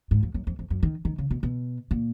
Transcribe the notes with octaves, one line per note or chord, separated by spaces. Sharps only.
G#2
F2
F#2
F2
F2
F#2
D#3
D#3
C#3
B2
B2
A#2